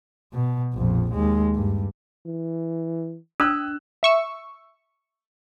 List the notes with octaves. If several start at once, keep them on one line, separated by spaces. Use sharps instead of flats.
B2
A#1 F2
D#2 G#3
G2
E3
D4 D#6 E6 F#6
E5 C#6 E6